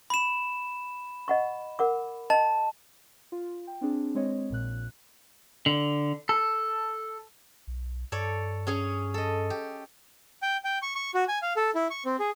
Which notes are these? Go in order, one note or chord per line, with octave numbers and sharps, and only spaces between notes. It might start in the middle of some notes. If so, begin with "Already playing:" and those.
B5 E7
D#5 F#5 C#6
A#4 F#5 D6
D#5 G5 A5
F4
G5
C4 D4 G#4
G#3 C4 C#5 D#5
A#1 A#2 F#6
D3
A4
B1
G2 A4 C#5 D5
C#4 G#4 C#5
A4 D#5
G4
G5
G5
C#6
C#6
F#4
G#5
F5
A4
E4
C#6
C4
G#4